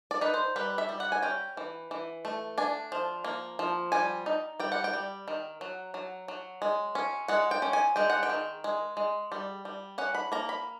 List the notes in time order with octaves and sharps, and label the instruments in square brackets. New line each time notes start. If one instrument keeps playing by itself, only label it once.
[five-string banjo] D5
D#4 B4
C5
G3 B4
E5
G3
F#5
G#5
C#4 G5
E3
E3
A3
D4 G#5
F3
A#3
F3
G3 G#5
D#4
G3 G5
F#5
G5
G3
D#3
F#3
F#3
F#3
G#3
C#4
G#3 F#5
G5
C#4
G#5
G#3 G5
F#5
G5
D#3
G#3
G#3
G3
G3
C#4 F#5
B5
A#3 A#5
B5